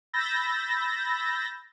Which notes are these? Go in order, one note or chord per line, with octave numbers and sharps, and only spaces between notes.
B5 E6 G6 A6 A#6